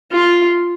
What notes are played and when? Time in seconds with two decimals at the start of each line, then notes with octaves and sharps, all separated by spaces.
0.11 F4